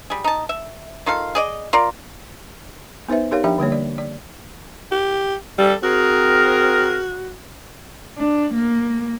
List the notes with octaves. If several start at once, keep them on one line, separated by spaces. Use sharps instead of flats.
G3 G#4
D#4 A5
E5
D#3 F4 A4 F5
G#4 D5 D#5
F4 A#4 D5
B3 D#4 B4 C5 E5
D#4 G4 A#4 C#5 F5
F3 D4 G4 E5 G5 B5
D3 G3 A#3 C#5
D5
D5
G4
G3 G4 A4
C4 F#4 G#4 A#4
D4
A#3